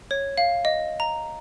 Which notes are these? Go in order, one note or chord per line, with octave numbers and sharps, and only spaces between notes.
C#5
F5
D#5
A#5